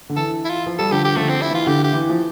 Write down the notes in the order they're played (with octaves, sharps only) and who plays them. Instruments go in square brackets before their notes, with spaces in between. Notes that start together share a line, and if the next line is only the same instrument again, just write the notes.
[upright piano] D3
[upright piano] E3 [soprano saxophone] A4
[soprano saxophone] E4
F4
[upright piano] F3
[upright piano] G3 [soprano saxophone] A4
[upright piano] D3 F3 [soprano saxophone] G4
[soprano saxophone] G4
[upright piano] D3 F3 [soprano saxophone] A3
[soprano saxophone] C4
E4
[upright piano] E3 [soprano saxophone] F4
[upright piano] D3 [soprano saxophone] G4
[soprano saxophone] G4
[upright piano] E3
F3